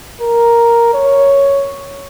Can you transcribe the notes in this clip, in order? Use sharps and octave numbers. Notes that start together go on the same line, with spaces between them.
A#4
C#5